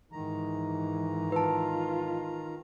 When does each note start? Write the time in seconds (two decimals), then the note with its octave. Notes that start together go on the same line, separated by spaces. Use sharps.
0.12 G#2 D#3 E3 A#5
1.32 F4 B4 A5